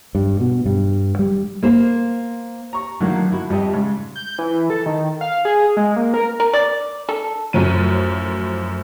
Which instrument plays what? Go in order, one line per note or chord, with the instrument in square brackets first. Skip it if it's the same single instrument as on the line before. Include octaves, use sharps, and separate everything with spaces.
[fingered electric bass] G2
B2
G2
G3
[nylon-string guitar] A#3 C5
[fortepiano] A#5 C#6
[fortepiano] A2 D3 D#3 [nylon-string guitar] F#3 A#3
[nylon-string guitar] E4 F#4
[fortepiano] F2 E5 [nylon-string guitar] G3 G4 D#5
[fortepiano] G#2 C#3
[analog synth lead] G6
E3
A4
D#3
F5
G#4
G#3
A#3
A#4
[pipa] A#4
D5
A4
[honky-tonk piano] F#2 A2 F3 D#7